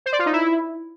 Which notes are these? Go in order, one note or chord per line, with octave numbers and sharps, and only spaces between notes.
C5
D5
F4
D#4
E4